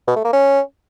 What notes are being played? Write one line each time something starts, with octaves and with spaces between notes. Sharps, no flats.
B2
A3
A#3
C#4